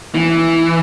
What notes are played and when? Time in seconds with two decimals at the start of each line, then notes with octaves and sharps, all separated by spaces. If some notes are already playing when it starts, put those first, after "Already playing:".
0.15 E3